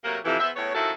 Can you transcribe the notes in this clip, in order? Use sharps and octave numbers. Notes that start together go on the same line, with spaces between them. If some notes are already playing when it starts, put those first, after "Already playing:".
C3 F#3 A3 A#3
F2 C3 E3
E2 B3 C5 E5
E2 A2 B3 C#5
F#2 D#3 F3 E4 F#4 A4